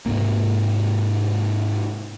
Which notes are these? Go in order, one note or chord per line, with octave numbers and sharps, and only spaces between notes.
G#2 C3 A#3